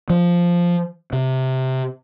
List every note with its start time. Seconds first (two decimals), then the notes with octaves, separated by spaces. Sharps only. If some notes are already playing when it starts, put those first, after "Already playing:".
0.10 F3
1.13 C3